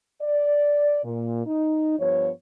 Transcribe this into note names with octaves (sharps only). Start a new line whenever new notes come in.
D5
A#2
D#4
G2 F3 B3 C#5